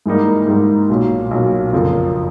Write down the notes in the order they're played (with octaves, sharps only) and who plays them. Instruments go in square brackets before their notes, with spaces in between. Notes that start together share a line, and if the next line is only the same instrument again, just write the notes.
[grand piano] G#2 E3 G3 A#3 D#4
G#2 E3 G3 A#3 D#4
B1 A#2 F#3
B1 A#2 F#3
F#1 F2 D3 F3 A#3